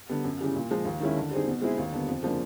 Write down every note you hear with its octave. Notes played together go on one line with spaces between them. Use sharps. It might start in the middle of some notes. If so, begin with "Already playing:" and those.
D3 G3 B3
F#2
C#3 E3 G3
A#2
F3 G#3
D#2
D#3 G#3 C#4 E4
D3
G3 C4 D#4 G#4
B2
G#3 C4 E4 G#4
D#2
D3 G3 B3
F2
C#3 F3 A#3 D4